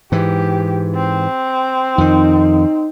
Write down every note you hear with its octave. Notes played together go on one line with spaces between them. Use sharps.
G#2 E3 G4
C4
F2 D#3 D#4